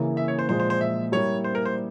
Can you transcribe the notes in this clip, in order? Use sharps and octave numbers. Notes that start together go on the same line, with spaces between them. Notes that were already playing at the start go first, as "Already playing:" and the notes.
Already playing: C#3 E3 A#3 C#4 E4
E5
C#5
C5
A#2 F3 G#3 C5
C5
C5
E5
G3 A#3 E4 C#5
C5
A#4
C5